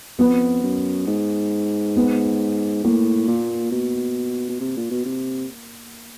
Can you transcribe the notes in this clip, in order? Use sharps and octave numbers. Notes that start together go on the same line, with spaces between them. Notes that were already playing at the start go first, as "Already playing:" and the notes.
F2 B3
F#2
G#2
B3
A2 A#3
A#2
B2
B2
C3
A#2
B2
C3